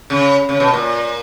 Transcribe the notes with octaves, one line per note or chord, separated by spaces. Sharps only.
C#3
C#3
B2
A#2